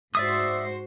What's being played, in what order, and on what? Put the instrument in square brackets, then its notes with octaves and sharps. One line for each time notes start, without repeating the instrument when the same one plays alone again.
[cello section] G#2 F#4 C5 [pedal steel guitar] D5 E5 D#6